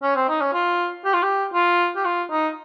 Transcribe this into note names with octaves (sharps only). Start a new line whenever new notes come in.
C#4
C4
D#4
C#4
F4
G4
F4
G4
F4
G4
F4
D#4